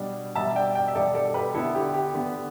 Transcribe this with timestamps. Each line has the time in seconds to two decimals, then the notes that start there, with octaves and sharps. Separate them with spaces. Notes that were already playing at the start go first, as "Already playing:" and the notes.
Already playing: B2 G3 D4
0.35 B2 G3 D4 E5 A5
0.55 D5 G5
0.75 D5 G5
0.88 E5
0.95 B2 G3 D4 A4 D5
1.14 A4 D5
1.34 G4 B4
1.54 D3 B3 D4 E4 A4
1.75 G4
1.94 G4
2.14 D3 B3 D4